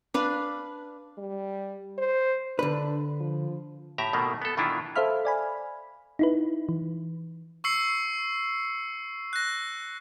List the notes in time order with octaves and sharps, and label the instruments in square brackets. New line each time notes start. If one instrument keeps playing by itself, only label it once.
[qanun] D4 B4 F5
[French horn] G3
C5
[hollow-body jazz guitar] D3 B4 [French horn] D4
[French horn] F3
[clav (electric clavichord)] A2 G4 E5 A#5
B2 D#3 A3 A#3
B3 A4
B2 D#3 E3 D4 E4 F4
[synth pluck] A4 C5 E5 F5 B5 F6
D5 G#5 B5
D#4 E4 B4
E3
[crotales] C#6 E6 C7 C#7
F#6 A#6